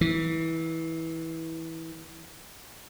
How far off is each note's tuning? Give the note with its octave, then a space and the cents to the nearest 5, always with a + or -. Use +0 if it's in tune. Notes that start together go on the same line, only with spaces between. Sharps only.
E3 -20